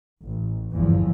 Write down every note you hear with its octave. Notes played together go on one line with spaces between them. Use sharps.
A1
G1 E2 G2 F3